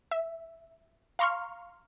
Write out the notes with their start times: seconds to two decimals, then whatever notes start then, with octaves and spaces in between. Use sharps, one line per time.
0.11 E5
1.19 F5 A#5 C6 C#6 F6